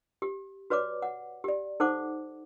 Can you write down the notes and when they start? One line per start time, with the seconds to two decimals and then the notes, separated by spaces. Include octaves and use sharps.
0.22 G4
0.70 F#4 B4 C#5 D5 D6
1.02 F#5
1.44 G4 D5
1.80 D#4 A4 C5 F#5 D6